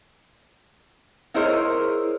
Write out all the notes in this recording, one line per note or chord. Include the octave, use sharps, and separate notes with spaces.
D#4 E4 G#4 A#4 C5 C#5